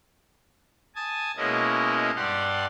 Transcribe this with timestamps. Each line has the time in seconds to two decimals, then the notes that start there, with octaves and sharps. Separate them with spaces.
0.95 G#5 A5 D#6
1.37 B2 G#3 A#3 C#4 E4 D#5
2.16 G2 G3 G4 D5 F#5 C6